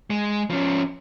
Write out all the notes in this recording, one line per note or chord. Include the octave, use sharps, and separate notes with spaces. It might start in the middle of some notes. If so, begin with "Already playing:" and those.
G#3
F3 C#4